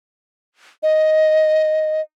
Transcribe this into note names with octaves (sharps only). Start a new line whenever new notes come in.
D#5